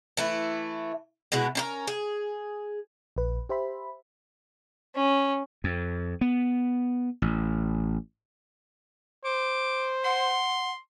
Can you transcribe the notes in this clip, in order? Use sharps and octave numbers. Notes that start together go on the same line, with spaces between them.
E3 A3 E4
B2 G#3 E4 F#4
C#4 D#4 A#4
G#4
A#1 B4
G4 C5 E5 B5
C#4
F2
B3
A1
C5 D6
F#5 C6